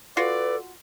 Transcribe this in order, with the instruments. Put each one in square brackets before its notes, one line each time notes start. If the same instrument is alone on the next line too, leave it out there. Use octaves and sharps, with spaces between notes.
[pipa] F4 F#4 [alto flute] A4 [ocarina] B4 [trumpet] D5